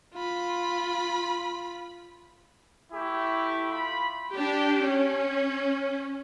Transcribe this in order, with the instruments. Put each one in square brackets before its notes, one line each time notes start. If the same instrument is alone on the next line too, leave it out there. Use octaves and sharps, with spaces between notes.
[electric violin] F4 B5
[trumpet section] A3 E4 G4
F4 B5
[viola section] D4 G4
C#4